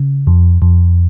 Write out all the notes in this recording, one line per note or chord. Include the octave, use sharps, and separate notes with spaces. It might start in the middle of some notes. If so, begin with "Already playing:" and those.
Already playing: C#3
F2
F2